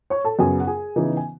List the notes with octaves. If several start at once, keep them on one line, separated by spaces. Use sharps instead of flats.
C#5 C#6
A4 A5
F#2 C#3 F#3 B3 G#4 G#5
F#5
G#4 G#5
C#3 E3 B3 D#4
G#5